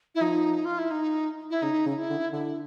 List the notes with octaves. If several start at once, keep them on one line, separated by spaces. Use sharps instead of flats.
E4
F3 D#4
F4
E4
D#4
E4
C#3 D#4
C#3
D#4
E4
D3
D3 E4